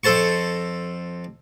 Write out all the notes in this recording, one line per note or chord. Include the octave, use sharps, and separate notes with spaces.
F2 A4 C5 A5 C#6